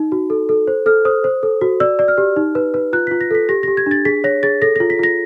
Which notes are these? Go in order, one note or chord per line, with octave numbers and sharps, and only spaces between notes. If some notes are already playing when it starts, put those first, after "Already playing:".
Already playing: D#4
F#4
A4
A4
C5
A4 F6
C5 D#6
C5
A4
F#4
D5 E6
D5
F6
G4
D#4
B4
B4
F4 F#6
F4 B6
A#6
A4 B6
G4 A#6
G4 A#6
G#6
D4 A6
G#4 B6
C#5 A#6
G#4 A6
A4 A#6
F4 A#6
B6
F4 A#6